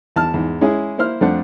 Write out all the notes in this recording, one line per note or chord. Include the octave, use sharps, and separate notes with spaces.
E2 A5 F6
E2 G#2
G#3 C#4 E4 G#4
A#3 E4 C5 F6
F2 A3 D4 C5 F#5